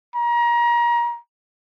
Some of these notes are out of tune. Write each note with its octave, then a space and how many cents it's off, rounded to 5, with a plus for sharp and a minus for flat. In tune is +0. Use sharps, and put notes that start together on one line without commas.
A#5 +30